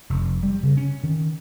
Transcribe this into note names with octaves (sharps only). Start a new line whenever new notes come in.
F1
G3
C#3
C#4
D#3